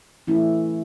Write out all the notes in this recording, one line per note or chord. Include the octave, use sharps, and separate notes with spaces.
E3 A3 C#4 E4